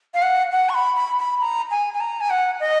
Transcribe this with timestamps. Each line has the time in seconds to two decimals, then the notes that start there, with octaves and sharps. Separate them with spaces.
0.14 F5
0.22 F#5
0.52 F#5
0.69 C#6
0.75 B5
0.96 B5
1.19 B5
1.41 A#5
1.71 G#5
1.94 G#5
2.00 A#5
2.21 G#5
2.30 F#5
2.60 D#5